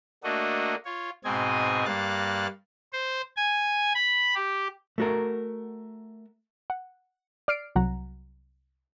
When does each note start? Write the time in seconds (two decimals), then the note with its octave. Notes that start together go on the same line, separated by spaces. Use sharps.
0.24 A3 A#3 D4 F#4 D#5
0.85 F4 C#5
1.25 G#2 B2 C4 D#5 G#5
1.85 G2 A#3 F5 F#6 A6
2.93 C5
3.37 G#5
3.94 B5
4.35 G4
4.98 A3 F#4 A#4
6.70 F#5
7.48 D5 F6 C7 D7
7.75 C2 F#3 F#5 A#5